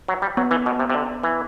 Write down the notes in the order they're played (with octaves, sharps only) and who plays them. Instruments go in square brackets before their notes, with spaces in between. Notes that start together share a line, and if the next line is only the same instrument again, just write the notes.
[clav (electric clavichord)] F#3
G3
[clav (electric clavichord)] F#3 [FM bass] B3
[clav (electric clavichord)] E3
B2
C3
C3
D3
E3